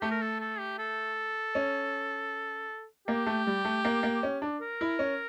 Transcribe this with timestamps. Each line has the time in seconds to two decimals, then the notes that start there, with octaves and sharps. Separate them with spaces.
0.01 A3 G4
0.11 A#4
0.21 A4
0.40 A4
0.59 G4
0.78 A4
1.55 C#4
3.07 A#3 G4
3.26 A3
3.47 G3
3.65 A3
3.85 A#3
4.03 A#3
4.23 C#4
4.42 D4
4.61 A#4
4.81 E4
4.99 C#4